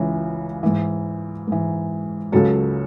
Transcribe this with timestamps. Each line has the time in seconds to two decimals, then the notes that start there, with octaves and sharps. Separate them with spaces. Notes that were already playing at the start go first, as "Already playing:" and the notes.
Already playing: C#2 C#3 E3
0.63 G#2 E3
1.48 G#2 E3
2.32 C#2 C#3 F#3 A4